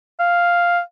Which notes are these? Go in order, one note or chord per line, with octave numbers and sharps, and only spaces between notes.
F5